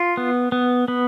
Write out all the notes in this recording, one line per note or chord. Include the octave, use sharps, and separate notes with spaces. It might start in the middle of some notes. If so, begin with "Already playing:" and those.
Already playing: F4
B3
B3
B3